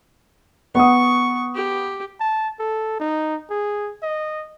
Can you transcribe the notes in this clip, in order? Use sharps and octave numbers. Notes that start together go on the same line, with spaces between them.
B3 F#5 C#6 D#6
G4
A5
A4
D#4
G#4
D#5